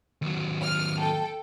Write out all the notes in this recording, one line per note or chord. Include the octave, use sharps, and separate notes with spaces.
D#2 F#3
F6
A4 G5